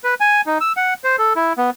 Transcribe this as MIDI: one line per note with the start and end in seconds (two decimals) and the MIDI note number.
0.04 0.14 71
0.20 0.41 80
0.46 0.58 63
0.61 0.72 88
0.77 0.94 78
1.04 1.16 72
1.18 1.33 69
1.36 1.53 64
1.58 1.70 59